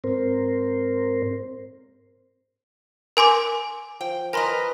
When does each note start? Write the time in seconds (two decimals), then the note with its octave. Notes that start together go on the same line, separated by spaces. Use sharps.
0.04 G#2 C4 A#4 C5
3.17 A#4 G#5 C6 D6
4.01 F3 G5
4.33 A#4 B4 D#5 G#5 A#5 C6